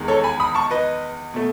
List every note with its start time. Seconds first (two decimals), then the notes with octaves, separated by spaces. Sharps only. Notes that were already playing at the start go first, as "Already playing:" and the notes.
Already playing: E2 D#3 G#3
0.08 A4 C#5
0.24 G#5 B5
0.40 B5 D#6
0.55 A5 C#6
0.71 B4 D#5
1.34 B2 A3